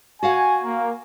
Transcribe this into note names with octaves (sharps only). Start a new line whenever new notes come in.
F#4 F5 F#5 G#5
A#3